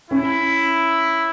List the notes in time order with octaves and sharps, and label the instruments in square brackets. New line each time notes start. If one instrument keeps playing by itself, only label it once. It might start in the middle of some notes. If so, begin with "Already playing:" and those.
[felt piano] C#4 [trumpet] E4